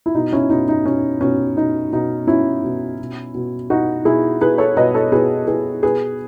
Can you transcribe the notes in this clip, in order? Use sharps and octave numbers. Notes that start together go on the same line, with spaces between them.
E4
B2 D#4
C#4 E4
B2 D#4
D#4
B2 C#4
B2 C#4
B2 D#4
B2 D#4
B2 C#4 E4
B2
B2
B2
B2 D#4 F#4
B2 E4 G#4
B2 G#4 B4
A4 C#5
B2 B4 D#5
A4 C#5
B2 G#4 B4
B2 G#4 B4
B2 G#4 B4